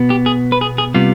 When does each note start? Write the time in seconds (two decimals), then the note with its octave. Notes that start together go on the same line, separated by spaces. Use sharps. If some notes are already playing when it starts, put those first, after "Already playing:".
Already playing: B2 B3
0.10 G4
0.26 G#4
0.52 B4
0.61 G#4
0.78 G#4
0.94 C3 G3 B3 F4